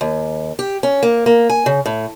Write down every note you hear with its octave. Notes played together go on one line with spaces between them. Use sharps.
D#2
G4
C#4
A#3
A#3
G#5
C#3
A2